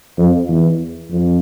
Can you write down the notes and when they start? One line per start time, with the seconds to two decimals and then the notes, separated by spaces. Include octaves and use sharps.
0.18 F2
0.49 E2
1.10 F2